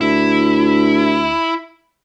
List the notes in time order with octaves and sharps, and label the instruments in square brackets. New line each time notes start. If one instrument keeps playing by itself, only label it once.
[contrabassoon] D2 [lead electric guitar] E4